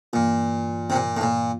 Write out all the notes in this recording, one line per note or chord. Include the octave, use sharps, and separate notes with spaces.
G2 A#2 E3 A#3 F4
C3
A#2
A2
A#2